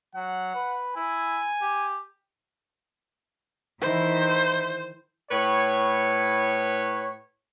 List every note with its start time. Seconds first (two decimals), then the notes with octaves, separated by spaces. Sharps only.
0.15 F#3 F#5
0.55 B4
0.96 E4 G#5
1.61 G4
3.81 D#3 E3 E4 C5
5.30 A2 B4 C#5